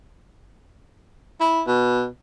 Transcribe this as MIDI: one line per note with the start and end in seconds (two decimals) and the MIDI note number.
1.41 1.62 64
1.67 2.08 47